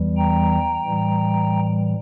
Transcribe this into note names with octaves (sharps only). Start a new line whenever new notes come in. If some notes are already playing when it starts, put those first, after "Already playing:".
Already playing: E2 E3 G3
G5 A#5
A2 E3 G3